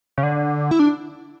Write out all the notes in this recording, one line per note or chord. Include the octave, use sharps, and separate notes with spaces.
C#3
D3
E4
D4